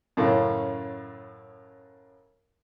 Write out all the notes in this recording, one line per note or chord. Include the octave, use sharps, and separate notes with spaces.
F#2 A2 C#3